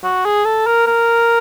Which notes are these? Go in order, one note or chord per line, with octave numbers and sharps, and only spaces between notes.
F#4
G#4
A4
A#4
A#4